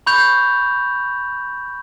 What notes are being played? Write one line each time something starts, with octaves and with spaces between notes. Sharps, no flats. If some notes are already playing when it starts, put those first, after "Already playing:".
B5 C#6 G6 F7